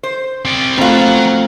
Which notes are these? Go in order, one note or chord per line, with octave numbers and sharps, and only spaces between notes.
C5
C4 D5
B2 A3 C4 F4 F#4 A#5